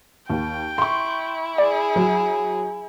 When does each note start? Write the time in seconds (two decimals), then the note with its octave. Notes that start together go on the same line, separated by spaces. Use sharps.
0.30 D#2 G5
0.78 E4 C6 C#6
1.58 G#4 D5
1.96 F#3